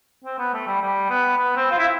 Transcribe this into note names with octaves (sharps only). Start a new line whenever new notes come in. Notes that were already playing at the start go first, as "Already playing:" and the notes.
C4
B3
A3
G3
G3
B3
B3
C4
F4
E4